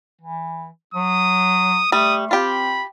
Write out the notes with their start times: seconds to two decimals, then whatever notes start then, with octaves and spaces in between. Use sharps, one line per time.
0.21 E3
0.94 F#3 D#6
1.92 G3 A3 D#6
2.31 C4 F4 G4 B5